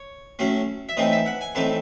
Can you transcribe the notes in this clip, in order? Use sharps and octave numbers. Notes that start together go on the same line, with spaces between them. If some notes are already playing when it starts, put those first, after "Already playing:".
Already playing: C#5
A2 F#3 A3 C#4
E5
A2 E3 A3 C4 D#4 D#5
E5
F#5
G#5
A2 E3 A3 C4 D#4 A5